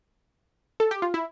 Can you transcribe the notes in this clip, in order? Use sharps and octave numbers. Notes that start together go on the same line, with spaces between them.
A4
G4
F4
E4